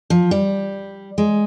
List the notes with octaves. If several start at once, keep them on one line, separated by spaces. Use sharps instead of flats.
F3
G3
G#3